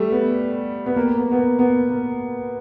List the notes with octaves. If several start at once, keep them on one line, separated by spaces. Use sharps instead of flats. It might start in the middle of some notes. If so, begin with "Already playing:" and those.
Already playing: G3 A3
B3
B3
A#3
B3
B3
A#3
B3
A#3